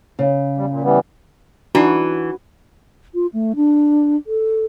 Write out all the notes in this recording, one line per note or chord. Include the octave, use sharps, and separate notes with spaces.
C#3
E2 G3
A#2
E3 G3 B3
E3 D4 D#4 F#4 A#5
F4
A3
D4
A4